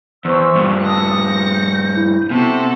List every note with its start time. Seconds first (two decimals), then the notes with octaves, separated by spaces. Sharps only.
0.25 E2 C5 C#6 E6
0.56 G2 A#2
0.85 A5 D#6 E6 A#6 C#7
1.25 G6
1.97 E4
2.31 C3 B3 F#4 A4